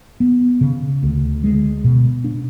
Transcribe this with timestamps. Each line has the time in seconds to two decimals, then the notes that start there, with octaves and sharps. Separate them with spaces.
0.20 B3
0.61 C#3
1.03 D2
1.44 G#3
1.84 B2
2.24 D4